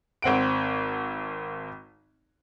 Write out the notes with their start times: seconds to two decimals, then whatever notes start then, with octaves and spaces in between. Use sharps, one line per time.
0.22 G#1 C4 F#5 D7